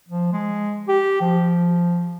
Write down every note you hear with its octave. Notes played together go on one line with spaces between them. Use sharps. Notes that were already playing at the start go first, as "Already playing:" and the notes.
F3
G#3
G4
F3